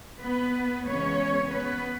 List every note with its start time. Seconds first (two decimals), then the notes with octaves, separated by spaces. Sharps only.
0.20 B3 B4
0.86 C#3 E3 G#3 B3 C#4 C#5
1.53 B3 B4